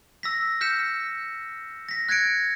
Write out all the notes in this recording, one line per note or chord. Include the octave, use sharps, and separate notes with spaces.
E6 A#6 B6
F6 G6 B6 C#7 E7
A#6 B6
F#6 G#6 A#6 C#7 D7